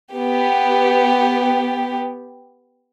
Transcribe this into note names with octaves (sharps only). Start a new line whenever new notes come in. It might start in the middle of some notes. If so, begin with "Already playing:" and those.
B3 G4